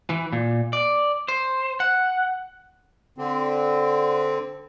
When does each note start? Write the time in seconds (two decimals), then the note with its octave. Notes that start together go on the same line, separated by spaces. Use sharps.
0.10 E3
0.33 A#2
0.73 D5
1.28 C5
1.80 F#5
3.18 D3 C4